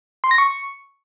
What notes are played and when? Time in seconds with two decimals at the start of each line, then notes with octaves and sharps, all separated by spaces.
0.24 C6
0.31 A#6
0.38 C#6